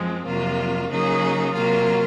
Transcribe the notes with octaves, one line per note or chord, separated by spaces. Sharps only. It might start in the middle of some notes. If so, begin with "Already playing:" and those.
Already playing: F#2 F3 G#3 C4
F2 C3 F#3 A#3 F4
C#3 F#3 A#3 D#4 G#4
C3 F#3 A#3 F4